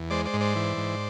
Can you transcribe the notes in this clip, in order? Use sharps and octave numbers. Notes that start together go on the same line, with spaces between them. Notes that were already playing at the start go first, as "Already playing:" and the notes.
Already playing: E2
G#3 C5 D5
C5 D5
G#2
C5 D5
E3
G#2